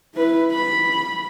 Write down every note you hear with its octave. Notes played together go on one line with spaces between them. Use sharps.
E4 B4
B5